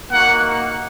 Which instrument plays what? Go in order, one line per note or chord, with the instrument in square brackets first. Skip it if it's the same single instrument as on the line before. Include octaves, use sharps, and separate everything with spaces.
[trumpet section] A#3 D#4 F#4 F#5